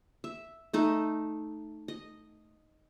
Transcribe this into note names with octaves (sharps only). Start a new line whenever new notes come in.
E5
A3 D#4 E5
D#5